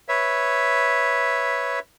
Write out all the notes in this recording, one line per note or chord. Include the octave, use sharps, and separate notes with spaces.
B4 C#5 E5